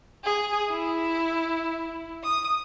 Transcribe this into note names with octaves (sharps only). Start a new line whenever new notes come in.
G#4
E4
D#6